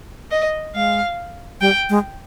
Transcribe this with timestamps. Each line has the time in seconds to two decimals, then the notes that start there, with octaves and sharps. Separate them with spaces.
0.31 D#5
0.75 G#3 F5
1.61 G3 G5
1.90 G#3